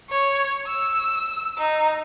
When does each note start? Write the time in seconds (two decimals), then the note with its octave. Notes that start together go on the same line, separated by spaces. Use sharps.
0.10 C#5
0.68 E6
1.58 D#4